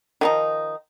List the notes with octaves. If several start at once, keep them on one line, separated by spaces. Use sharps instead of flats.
D#3 F3 D#4